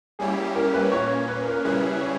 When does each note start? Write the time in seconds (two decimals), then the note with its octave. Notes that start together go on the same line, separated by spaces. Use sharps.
0.19 G3 A#3 C#4 E4 G4 G#4
0.55 A#4
0.73 B4
0.92 A#2 A#3 C#4 C#5
1.28 B4
1.47 A#4
1.65 C#3 G3 C#4 E4 G#4 B4
2.01 C#5